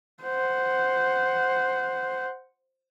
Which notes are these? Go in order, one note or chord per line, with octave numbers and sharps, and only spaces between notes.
C5 F#5